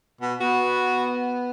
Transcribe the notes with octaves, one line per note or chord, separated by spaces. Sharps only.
B2
B3 F#4